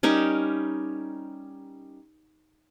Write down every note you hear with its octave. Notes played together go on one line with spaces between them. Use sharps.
G3 C#4 D#4 A#4